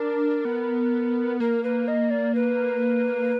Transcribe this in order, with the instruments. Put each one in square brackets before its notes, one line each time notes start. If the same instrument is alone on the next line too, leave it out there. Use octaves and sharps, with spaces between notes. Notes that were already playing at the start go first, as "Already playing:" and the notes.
Already playing: [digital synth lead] D4 [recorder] A#4
[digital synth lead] B3
[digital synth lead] A#3 [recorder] A#4
[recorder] B4
D#5
D5
B4